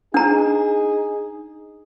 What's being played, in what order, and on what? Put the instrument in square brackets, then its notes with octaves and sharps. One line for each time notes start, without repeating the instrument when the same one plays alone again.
[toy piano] D4 A#5 [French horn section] D#4 G#4